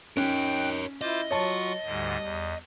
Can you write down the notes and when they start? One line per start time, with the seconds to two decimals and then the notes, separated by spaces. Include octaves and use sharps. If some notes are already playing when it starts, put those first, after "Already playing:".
0.17 C#4 D#4 A#4 C#5 G5 F#6
1.01 E4 F4 C5 D#5 D6
1.31 F#3 F4 C#5 F#5 A5 C#6
1.85 D2 G#2 D3 G3
2.22 E2